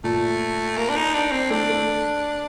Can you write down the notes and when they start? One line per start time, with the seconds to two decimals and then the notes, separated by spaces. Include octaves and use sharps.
0.04 A#2 A3
0.77 A#3
0.89 D4
0.96 D#4
1.14 D4
1.32 C4
1.50 A3 D4
1.69 A3